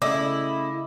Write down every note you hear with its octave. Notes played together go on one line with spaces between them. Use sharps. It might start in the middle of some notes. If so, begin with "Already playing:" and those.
C#3 A3 E4 D#5 D6